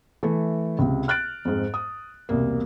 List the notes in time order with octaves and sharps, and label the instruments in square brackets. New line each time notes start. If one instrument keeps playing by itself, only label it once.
[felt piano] E3 A3 A4
C#2 C3
F6 F#6 A6 D7
F2 G#2
D#6
E1 C2 A#3